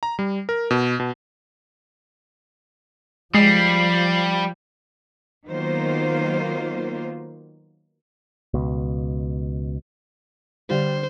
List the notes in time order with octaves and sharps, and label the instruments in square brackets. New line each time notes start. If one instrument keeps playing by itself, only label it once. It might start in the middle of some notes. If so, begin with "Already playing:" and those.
[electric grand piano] A#5
G3
A#4
B2
B2
[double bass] F3 [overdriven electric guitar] G3 [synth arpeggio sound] G#3 [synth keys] C7
[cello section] D#3 F#3 A#3 B3 F4 C5
[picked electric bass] C#2 B2
[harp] D3 F5 [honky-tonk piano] G3 [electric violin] C5